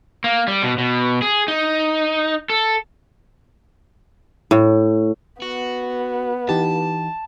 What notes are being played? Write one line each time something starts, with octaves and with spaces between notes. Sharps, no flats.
A#3
G3
B2
B2
G#4
D#4
A4
A2
B3 F#4
E3 D#4 G4 A5